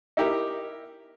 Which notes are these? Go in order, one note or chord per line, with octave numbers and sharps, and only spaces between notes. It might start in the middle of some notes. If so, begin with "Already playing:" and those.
D#4 E4 G4 A#4